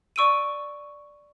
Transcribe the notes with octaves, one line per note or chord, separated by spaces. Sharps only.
D5 C#6 E6 D7 D#7